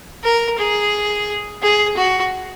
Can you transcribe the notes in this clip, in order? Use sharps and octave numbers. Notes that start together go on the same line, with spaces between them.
A#4
G#4
G#4
F#4